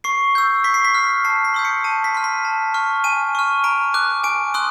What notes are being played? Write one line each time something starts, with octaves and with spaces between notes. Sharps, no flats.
C#6 C7
E6 G6
C#6 B6
C7
B6
F6
A5 C7
B6
C6 D#6 G6
C#7
A5 D#7
B6
C6 F6
B6
A5
C#6 F6
G#5 D#7
C#6 F6
A#5 D7
D6 F#6
G#5 D7
C6 D#6 F#6